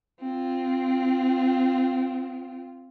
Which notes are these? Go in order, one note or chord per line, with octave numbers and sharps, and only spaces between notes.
C4 F4